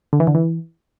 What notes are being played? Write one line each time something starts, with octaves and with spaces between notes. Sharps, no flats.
D3
E3
D3
E3